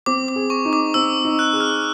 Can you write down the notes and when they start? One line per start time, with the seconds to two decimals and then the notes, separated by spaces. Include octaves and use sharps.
0.06 C4 D6
0.28 D6
0.36 G#4
0.50 C#6
0.65 D#4
0.73 D6
0.94 C4 E6
1.25 D#4
1.39 F#6
1.53 G#4
1.60 F6